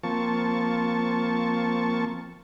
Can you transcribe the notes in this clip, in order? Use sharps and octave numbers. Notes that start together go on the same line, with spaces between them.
F3 A#3 C4 A5 C#6